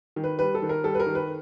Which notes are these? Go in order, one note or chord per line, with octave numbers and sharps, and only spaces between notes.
D#3
B4
G3 B4
A4
D#3
A#4
G3 A4
B4
A#4
D#3
B4